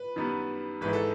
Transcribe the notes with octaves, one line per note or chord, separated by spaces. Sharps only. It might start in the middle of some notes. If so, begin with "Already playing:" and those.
Already playing: B4
F#2 D#3 G3 B3
G#1 G#2 E3 B4
A4